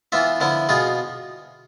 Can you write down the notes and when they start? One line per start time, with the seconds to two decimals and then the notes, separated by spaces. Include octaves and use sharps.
0.12 E3 B3 F4 E5
0.40 D3 F3 B3 E4
0.69 B2 B3 F4 G#4